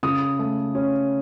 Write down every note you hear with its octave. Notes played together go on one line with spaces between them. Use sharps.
C#3 D#6
A3
C#4